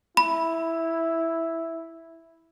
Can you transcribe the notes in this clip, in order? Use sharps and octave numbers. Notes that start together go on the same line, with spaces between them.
E4 B5